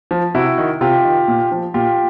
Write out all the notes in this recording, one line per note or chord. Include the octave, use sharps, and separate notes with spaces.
F3
C3 E4 F#4
D#3
C3 F4 G4
D#3
A#2
F3
A#2 F4 G4